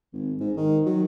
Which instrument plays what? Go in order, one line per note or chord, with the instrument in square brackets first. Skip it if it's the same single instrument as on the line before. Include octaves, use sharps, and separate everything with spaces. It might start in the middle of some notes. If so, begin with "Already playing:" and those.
[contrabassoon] G#1
G#2
D#3
F#3